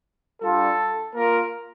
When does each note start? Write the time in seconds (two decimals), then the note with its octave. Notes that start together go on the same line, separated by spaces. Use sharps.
0.42 G3 D4 F4 A4
1.15 A#3 F4 A#4